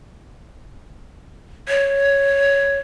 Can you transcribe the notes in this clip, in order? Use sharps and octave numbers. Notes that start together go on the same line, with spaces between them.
C#5